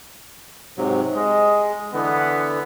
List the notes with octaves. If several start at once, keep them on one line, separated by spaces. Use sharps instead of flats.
G#2 C3 F#3
G#3 D#5
D3 E3 B3